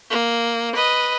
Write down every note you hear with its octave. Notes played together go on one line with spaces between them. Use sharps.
A#3
B4 D#5